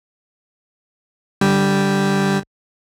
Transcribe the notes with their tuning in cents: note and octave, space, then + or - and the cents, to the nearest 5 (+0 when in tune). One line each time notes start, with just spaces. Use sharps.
D3 +0 G3 +0 G5 +0